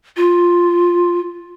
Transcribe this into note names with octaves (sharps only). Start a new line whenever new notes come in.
F4